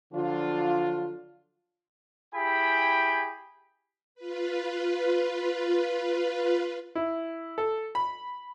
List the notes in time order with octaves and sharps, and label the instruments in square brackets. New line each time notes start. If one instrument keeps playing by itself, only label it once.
[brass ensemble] D3 F3 F#3 D4 F4
[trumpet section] E4 G4 G#4 G5 G#5 B5
[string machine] F4 B4
[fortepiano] E4
A4
B5